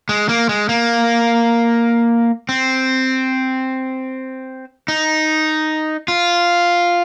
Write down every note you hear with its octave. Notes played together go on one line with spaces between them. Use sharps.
G#3
A#3
G#3
A#3
C4
D#4
F4